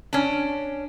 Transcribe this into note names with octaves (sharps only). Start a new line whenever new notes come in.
C#4 D4